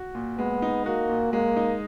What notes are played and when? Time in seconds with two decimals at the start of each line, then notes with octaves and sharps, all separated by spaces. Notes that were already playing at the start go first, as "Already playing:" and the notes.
Already playing: F#4
0.15 A#2
0.39 G#3 B3
0.62 D#4
0.86 A#3 F#4
1.09 A#2
1.33 G#3 A#3
1.57 D#4